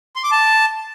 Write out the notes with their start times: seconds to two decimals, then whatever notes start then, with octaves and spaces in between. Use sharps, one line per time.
0.16 C6
0.24 D6
0.32 A5